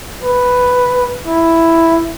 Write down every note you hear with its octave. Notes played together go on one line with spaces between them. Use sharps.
B4
E4